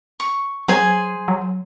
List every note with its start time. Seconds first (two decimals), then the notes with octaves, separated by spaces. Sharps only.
0.20 C#6
0.68 F#3 G#4 C5 G#5
1.28 F#3